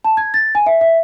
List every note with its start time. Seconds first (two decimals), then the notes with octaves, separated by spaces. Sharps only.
0.04 A5
0.17 G#6
0.34 A6
0.55 G#5
0.66 E5
0.81 E5